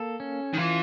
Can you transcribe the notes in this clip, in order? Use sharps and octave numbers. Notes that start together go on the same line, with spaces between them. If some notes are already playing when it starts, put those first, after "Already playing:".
Already playing: A#3 A4
C#4
D#3
E3 F4